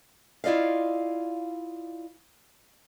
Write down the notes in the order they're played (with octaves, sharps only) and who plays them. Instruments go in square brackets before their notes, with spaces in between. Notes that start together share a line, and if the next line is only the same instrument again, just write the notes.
[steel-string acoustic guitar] E4 F4 D5 D#5 F5